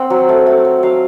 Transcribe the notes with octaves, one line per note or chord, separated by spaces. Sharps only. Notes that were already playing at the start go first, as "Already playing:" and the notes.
Already playing: C4 F#5
F#3
A3
A3
F#3
F#3 F5